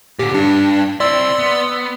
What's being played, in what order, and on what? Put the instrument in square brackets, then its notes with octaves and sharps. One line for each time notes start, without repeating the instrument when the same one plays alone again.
[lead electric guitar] A#2 D3 [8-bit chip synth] G4
[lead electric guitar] G2 [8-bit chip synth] D4
[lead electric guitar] C4 E4 [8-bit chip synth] D5 C6 E6
[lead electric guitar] B3